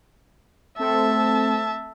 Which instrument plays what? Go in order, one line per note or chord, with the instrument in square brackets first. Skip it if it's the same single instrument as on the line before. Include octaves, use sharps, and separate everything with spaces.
[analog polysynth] A3 C4 A4 [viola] E5 A5